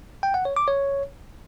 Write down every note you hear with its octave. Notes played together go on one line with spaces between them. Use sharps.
G5
F#5
C#5
D6
C#5